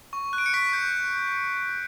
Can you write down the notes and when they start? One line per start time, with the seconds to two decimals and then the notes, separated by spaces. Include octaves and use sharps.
0.13 C#6
0.33 F#6
0.38 D7
0.46 C#7
0.54 C#6 B6
0.73 G6